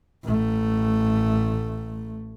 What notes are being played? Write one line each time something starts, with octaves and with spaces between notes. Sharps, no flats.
A1 A3